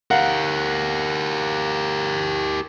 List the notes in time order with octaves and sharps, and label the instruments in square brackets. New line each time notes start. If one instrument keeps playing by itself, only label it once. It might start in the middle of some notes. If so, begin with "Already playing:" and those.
[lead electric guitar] G4 A#4 [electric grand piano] F5 F#5